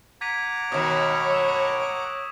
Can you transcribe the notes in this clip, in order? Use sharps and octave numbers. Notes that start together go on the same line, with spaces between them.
F#5 A#5 D6 G#6 B6 D#7
B2 D#3 C#5 D#6 E7
C#6 E6 E7